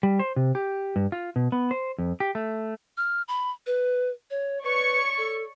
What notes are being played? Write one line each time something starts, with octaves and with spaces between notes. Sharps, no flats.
G3
C5
C3
G4
G2
F4
B2
B3
C5
F2
G4
A3
F6
B5
B4
C#5
B4 C#5 D5 C#6
A4